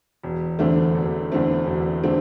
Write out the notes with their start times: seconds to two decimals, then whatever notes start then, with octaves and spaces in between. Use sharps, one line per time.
0.24 E1
0.59 E2 D3 A3 C4
0.95 E1
1.32 E2 D3 A3 C4
1.67 E1
2.03 D3 A3 C4